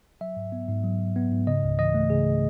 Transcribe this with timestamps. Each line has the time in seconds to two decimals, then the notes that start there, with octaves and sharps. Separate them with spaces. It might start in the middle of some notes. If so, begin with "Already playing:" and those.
0.21 F#3 E5
0.36 G#2
0.52 B3
0.68 G#2
0.84 F#3
1.00 G#2
1.16 B3
1.31 G#2
1.47 C#3 D#5
1.63 C#2
1.79 E3 D#5
1.94 A3
2.10 C#3 G#4